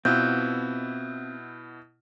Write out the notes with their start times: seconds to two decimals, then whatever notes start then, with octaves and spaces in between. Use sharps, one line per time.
0.05 B2 B3 C4 E4 F4 E6 F#6 G6